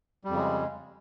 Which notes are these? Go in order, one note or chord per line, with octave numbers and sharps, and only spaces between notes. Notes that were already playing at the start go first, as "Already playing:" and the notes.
F2 C#3 G3 G#3